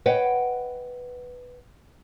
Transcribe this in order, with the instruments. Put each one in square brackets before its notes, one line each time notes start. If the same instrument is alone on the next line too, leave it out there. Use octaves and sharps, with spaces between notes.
[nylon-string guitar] B4 C#5 D#5 F#5 G5